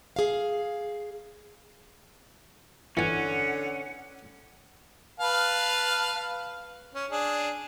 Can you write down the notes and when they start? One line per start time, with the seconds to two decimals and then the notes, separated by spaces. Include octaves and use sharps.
0.16 G#4 F5
2.97 D3 E3 C#4 F#5 G#5
5.20 B4 F5 A5
6.95 C#4
7.11 D4 G#4